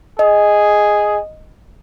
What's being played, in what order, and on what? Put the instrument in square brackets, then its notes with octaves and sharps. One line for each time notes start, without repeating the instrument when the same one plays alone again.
[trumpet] G#4 [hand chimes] D#5